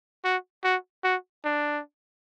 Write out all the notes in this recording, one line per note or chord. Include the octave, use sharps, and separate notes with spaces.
F#4
F#4
F#4
D4